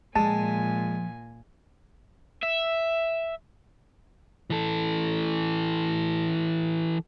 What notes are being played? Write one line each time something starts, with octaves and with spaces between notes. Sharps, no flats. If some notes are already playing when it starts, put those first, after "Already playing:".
A#2 F3 G#3 G#5 A5
E5
E3 A4